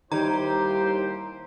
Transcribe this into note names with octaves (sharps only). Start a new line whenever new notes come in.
D#2 D#3 G3 E4 G4 C5 A#5